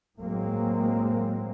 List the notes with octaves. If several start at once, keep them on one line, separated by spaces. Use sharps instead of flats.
A2 F#3 G#3 A#3 C4